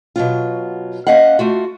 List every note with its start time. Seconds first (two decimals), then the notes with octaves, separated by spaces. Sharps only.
0.16 B2 F#3 F4
1.07 A#3 C#4 D#5 F5 F#5
1.39 A3 F4 F#4